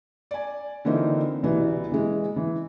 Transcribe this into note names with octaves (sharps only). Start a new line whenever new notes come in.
D5 G#5
D3 E3 A#3 C4 D#4 F4
C2 B2 E3 B3
E3 G#3
E3